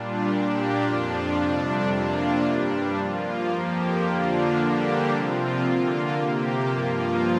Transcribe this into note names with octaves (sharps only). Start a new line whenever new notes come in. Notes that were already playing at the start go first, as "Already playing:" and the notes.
Already playing: A#2 G3 D4 F4
A#2 A#3 D4 G4
F2 F3 D4 F4
F2 C3 G3 D4
C3 A#3 D4 F4
G2 G3 D4
F3 A#3 F4
F2 F3 A#3 G4
D3 F3 A#3 D4 F4
D3 G3 A#3 D4 G4
C3 F3 C4 F4
D3 A#3 F4
C3 A#3 G4
G2 F3 A#3 F4